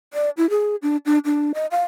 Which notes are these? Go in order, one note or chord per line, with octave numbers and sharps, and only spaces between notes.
D5
E4
G#4
D4
D4
D4
D#5
F5